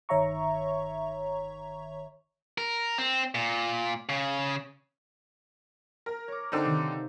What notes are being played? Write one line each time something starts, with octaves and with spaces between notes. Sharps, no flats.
G1 D#3 C#5 E5 A#5 C#6
A#4
C4
A#2
C#3
A#4
C#5 D6
D3 C4 D#4 D6
C3 D#3 A#3